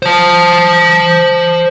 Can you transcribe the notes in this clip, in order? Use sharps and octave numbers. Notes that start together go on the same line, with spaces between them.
C5 A5